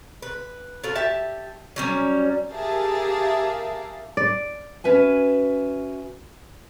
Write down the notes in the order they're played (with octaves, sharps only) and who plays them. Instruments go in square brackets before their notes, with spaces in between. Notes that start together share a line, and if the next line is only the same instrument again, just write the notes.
[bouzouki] B4
F4 F#4 A4
G4 E5 A5
F#3 G3 C#4
[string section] G4 G#4 A#4 E5 F5 A5
[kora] D5
[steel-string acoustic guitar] C#4 F#4 B4 E5 G#5